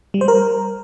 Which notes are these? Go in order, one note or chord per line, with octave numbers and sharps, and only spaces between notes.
G3
C5
A#4